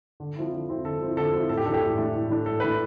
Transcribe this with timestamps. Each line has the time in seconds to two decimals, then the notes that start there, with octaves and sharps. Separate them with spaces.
0.20 D3
0.36 F3 C4 E4
0.52 D3
0.69 F3 C4 E4
0.85 D3 A4
1.01 F3 C4 E4
1.17 D3 A4
1.33 F3 C4 E4
1.49 A2 A4
1.57 G4
1.66 E3 A3 D4 A4
1.74 G4
1.82 A2
1.98 E3 A3 D4
2.14 A2
2.30 E3 A3 D4
2.46 A2 A4
2.60 E3 A3 D4 B4